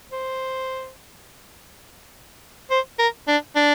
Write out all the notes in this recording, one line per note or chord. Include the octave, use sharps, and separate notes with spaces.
C5
C5
A#4
D4
D4